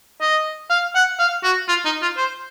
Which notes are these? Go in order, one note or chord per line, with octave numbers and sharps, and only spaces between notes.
D#5
F5
F#5
F5
F#4
F4
D#4
F4
C5